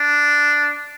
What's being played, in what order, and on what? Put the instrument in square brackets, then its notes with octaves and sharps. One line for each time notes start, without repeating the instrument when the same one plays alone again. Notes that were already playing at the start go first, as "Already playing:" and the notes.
Already playing: [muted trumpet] D4